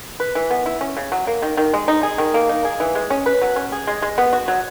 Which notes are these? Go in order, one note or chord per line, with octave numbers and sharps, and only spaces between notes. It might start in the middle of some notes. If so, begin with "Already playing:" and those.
B4
E3
B3
E4
C#4
C#3
F#3
A#3
D#3
D#3
G#3
D#4
G#4
D#3
A#3
D#4
G#4
E3
G#3
C#4
B4
F#3
C#4
G#4
G#3
G#3
B3
F#4
F#3